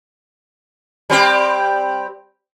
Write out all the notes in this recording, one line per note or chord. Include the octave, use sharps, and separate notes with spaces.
G3 C4 G4